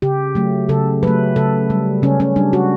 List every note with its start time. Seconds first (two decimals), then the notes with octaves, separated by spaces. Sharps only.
0.02 C#3 G4
0.35 F#3 A3
0.69 C#3 A4
1.03 F#3 A3 B4
1.36 C#3 A4
1.70 G3
2.02 C#3 C#4
2.20 C#4
2.36 G3 D4
2.53 F#4